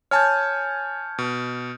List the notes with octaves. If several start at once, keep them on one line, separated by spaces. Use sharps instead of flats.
C#5 G#5 A5 F6 G6
B2